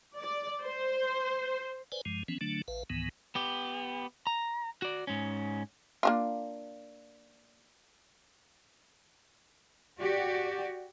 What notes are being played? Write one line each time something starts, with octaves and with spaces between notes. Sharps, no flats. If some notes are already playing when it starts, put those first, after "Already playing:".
D5
C5
B4 C5 D5 G#5
G2 F3 G#3
E3 F3 B3 C#4
D3 F#3 A3 D4
A1 B4 F5
C#2 G#2 D#3 E3 B3
B3 G4
A#5
F#4 D5
G#2 C#4
A#3 D4 F4
F#4 G4 D5